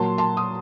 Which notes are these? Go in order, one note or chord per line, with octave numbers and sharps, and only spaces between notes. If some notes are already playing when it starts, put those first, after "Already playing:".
Already playing: A#2 F#3 A#3 A5 C6
A5 C6
D#6